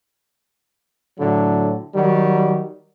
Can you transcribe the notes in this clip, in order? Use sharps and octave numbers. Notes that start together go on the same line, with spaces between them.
A2 D3 F#3
D#3 F#3 G3